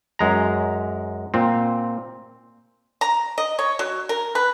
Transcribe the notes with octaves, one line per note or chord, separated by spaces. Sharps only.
F#2 G#3 A#5
A#2 C4
A#5
D#5
C#5
F#3
A#4
B4